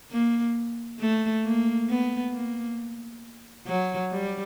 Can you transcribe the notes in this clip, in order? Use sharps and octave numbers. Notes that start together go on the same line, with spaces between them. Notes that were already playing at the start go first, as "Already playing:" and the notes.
A#3
A3
A#3
B3
A#3
F#3
G3